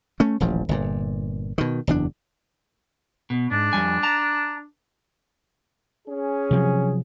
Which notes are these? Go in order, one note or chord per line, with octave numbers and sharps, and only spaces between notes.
A3 C#4
D#1 A1 F3
G1 A#2
B2 D#3
F#1 E2 D4
B2
G#2 D4
F2 G3 G#5
A5 A#5
C#4 G#4
C3 F3 F#3